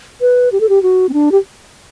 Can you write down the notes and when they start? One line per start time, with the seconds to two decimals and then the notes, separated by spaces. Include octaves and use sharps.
0.21 B4
0.52 G4
0.60 A4
0.69 G4
0.83 F#4
1.09 C4
1.14 D4
1.32 G4